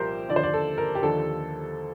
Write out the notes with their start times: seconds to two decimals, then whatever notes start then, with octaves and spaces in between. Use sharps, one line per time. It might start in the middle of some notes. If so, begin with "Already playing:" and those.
Already playing: C2 A#2 F3 G4 A#4 C5
0.29 D#2 D3 F3 D5
0.36 C5
0.43 D5
0.53 A4
0.78 A#4
0.95 G4
1.02 D#2 D3 F3 A4